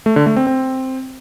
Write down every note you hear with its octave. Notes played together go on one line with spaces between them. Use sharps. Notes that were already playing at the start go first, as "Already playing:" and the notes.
A3
D3
A3
C4
C4